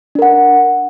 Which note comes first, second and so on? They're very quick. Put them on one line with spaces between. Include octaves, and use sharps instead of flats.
D4 A#4 F#5